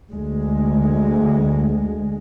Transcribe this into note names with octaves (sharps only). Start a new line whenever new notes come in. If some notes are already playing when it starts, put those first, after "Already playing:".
D2 G#3